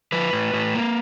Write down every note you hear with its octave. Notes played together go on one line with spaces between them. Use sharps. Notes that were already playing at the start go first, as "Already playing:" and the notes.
F3 B4
A2
A2
A#3